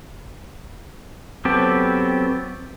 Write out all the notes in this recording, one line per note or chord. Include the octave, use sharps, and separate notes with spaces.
F#3 B3 C4 G4 A4